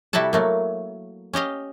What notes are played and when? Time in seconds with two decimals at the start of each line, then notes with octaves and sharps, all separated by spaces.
0.13 C3 G3 E4 F#4 A4 A5
0.33 F#3 A3 A#3
1.33 C#4 G4 D#5 F5